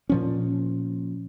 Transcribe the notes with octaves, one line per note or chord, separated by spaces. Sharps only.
A#2 F3 C#4